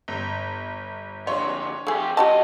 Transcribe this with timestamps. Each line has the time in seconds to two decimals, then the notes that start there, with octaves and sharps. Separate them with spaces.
0.08 G1
1.27 F2 D3 C#5 C6
1.87 F2 A3 G4 G#4
2.17 D2 F#4 G4 D#5 A5